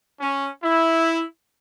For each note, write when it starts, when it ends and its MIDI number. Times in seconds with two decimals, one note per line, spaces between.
0.21 0.48 61
0.63 1.22 64